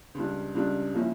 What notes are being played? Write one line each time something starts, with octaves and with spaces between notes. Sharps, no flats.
C#2 C#3 G3 D4
C#2 C#3 G3 D4
F3 A#3 C#4 E4